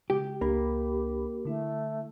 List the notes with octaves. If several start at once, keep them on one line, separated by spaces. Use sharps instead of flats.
C#3 G#3 G4
C#2 A#3 D4 G4 B5
D3 A3 E4